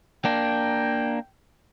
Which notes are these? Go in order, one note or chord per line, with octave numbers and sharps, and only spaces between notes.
A#3 D4 G5